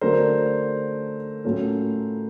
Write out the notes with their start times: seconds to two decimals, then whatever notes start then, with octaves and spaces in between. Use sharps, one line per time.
0.01 D3 F#3 A3 D4 A#4 C5
1.44 A2 F#3 A3 C#4 F4